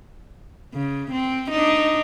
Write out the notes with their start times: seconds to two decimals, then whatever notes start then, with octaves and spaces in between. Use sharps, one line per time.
0.74 C#3
1.12 C4
1.51 D4 D#4